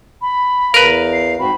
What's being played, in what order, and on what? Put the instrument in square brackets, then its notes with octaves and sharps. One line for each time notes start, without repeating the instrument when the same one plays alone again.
[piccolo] B5
[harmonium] E2 F5 [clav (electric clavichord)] A#4 B4
[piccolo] C7
[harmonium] G#2 C4 F#4 [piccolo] B5